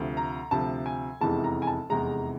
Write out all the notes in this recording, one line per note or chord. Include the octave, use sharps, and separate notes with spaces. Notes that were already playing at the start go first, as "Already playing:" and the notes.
Already playing: D2 C3 F3
A#5
D2 C3 F3 A5
G#5
F1 E2 C3 E3 G#3 A5
A#5
G#5
A5
F1 E2 C3 E3 G#3 A#5